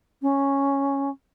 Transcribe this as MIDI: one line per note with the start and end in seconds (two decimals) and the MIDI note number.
0.22 1.09 61